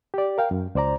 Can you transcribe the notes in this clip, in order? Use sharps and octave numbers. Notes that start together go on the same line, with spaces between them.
G4 D5
A#4 F5 G5
F#2
C#2 C5 D5 A#5